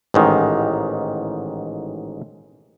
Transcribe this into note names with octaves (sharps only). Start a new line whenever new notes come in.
A1 G#2 D#3